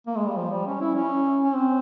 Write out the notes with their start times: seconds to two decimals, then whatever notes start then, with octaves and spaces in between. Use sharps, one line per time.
0.07 A#3
0.17 G#3
0.27 G3
0.37 F3
0.52 G3
0.67 C#4
0.81 E4
0.95 C#4
1.44 C#4
1.54 C4